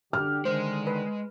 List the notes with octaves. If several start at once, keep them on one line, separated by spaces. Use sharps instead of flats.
D3 D4 G4 F6
D3 D#3 G#3 C5
B4